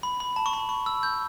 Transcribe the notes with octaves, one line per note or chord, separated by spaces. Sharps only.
B5
B5
A5
C#6
B5
C#6
E6
G6